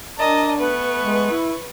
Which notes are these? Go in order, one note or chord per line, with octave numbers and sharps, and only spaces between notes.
D4 A#4 D5 D#5 A5
A3 B3 B4 C#6
G#3
E4